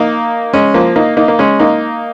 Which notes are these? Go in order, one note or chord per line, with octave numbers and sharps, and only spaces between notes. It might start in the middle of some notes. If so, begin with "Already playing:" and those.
Already playing: A#3 D#4
G#3 C#4
F3 A#3
A#3 D#4
A#3 D#4
A#3
G#3 C#4
A#3 D#4